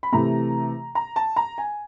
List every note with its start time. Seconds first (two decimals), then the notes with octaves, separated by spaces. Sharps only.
0.03 B5
0.12 C3 E3 A3 A#5
0.95 A#5
1.16 A5
1.36 A#5
1.58 G#5